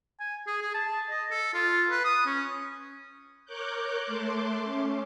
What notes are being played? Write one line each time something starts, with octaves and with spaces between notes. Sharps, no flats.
G#5
G#4
G#4
A5
D#5
A4
F4
B4
D#6
C#4
A#4 C#5 D6 F#6 G6
A3 A5 C6 D6
A3 C#4